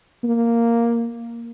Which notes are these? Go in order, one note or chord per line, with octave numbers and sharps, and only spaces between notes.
A#3